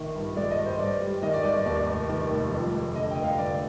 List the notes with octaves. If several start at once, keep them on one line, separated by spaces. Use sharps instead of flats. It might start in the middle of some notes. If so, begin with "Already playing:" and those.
Already playing: A#1 D#3
G2
G#3 D5
D#5
G2
C5
G2 D5
G3
D#3 D#5
D5
G#1 D5
D#2 D5
F1
D#3
F1
F2
G#3
D3 D#5
G5
F1
F5
D3 D5